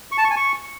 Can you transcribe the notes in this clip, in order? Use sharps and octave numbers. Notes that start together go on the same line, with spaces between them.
C#6
A5
C#6
G#5
C#6